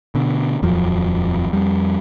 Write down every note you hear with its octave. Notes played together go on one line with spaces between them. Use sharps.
B2 D3
D#1 F2 F3 F#3
F2 G3